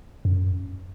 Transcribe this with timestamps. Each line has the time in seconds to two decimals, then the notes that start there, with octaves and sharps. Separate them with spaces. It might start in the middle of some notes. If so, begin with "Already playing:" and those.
0.25 F#2